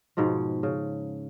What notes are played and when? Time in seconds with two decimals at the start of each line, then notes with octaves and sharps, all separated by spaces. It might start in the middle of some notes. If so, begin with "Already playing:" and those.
0.17 G#2 B2 F3 G#3
0.63 C#3